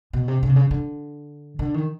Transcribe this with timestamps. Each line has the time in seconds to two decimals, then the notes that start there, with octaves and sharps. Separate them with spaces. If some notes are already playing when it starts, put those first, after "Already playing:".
0.13 B2
0.28 C3
0.43 C#3
0.49 C3
0.56 C#3
0.71 D3
1.59 D3
1.74 D#3